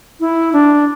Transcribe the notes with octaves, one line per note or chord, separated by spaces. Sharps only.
E4
D4